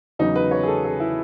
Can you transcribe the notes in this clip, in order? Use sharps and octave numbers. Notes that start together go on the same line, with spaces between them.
E2 C#3 F#3 D#4
B4
C#5
G#4
A4
G#4
E4